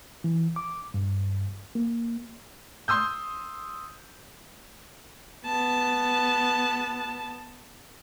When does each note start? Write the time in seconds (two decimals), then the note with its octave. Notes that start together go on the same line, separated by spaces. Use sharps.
0.24 E3
0.56 D6
0.94 G2
1.75 A#3
2.88 C6 D#6 E6 G6
5.46 B3 A5